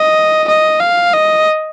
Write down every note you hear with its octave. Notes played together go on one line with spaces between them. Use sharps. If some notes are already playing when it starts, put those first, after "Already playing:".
Already playing: D#5
D#5
F5
D#5